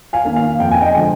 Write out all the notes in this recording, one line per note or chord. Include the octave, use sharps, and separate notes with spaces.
F5 G#5
D#3 A#3
F5
F2 G5
G#5
D#5 G5
D3 F3 G#3